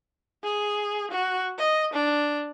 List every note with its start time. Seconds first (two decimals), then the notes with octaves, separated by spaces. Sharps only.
0.43 G#4
1.11 F#4
1.58 D#5
1.93 D4